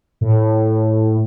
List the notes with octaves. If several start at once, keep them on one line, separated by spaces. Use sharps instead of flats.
A2